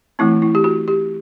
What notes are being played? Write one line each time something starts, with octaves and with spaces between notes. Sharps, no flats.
E3 A3 C4 E4
E4
G4
F#4
G4